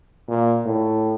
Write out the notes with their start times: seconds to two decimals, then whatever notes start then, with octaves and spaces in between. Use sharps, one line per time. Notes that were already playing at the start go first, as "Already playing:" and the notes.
0.28 A#2
0.65 A2